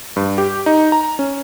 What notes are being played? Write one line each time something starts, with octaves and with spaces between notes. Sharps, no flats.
G2
G4
D#4
A#5
C#4